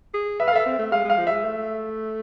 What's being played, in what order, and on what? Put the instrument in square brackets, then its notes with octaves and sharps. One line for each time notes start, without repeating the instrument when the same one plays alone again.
[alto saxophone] G#4
[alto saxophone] B4 [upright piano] E5
[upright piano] F5
[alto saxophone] A4 [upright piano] E5
[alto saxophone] C4
A3
[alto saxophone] G#3 [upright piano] F5
[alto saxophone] G#3 [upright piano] F5
[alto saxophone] F3
[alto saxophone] G#3 [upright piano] E5
[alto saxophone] A3